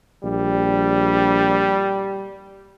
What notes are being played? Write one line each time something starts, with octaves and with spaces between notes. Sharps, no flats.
A#1 G3